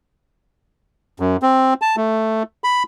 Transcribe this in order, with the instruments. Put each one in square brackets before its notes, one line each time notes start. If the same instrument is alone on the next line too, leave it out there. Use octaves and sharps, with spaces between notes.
[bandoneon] F#2
C4
A5
A3
B5